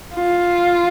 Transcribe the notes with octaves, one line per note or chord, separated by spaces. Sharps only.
F4